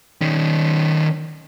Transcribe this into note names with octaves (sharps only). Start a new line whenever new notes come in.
D#3 C#4